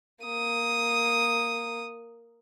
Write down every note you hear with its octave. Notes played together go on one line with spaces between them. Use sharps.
A#3 D#6